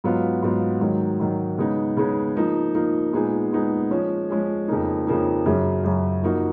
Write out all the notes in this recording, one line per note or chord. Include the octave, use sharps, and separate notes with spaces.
G#2 F#3 B3 F4
G#2 F#3 B3 F4
G#2 D#3 F#3
G#2 D#3 F#3
C#3 G#3 B3 D#4
C#3 G#3 B3 D#4
F3 A#3 D#4
F3 A#3 D#4
A#2 G#3 B3 D#4 G#4
A#2 G#3 B3 D#4 G#4
F3 G#3 C#4 G#4
F3 G#3 C#4 G#4
F2 C#3 F3 A#3 D#4
F2 C#3 F3 A#3 D#4
F#2 C#3 F#3
F#2 C#3 F#3
F3 A#3 D#4 F#4